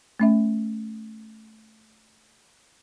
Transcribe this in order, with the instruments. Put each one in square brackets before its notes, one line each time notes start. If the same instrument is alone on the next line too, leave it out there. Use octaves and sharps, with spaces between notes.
[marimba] A3 C#4 E5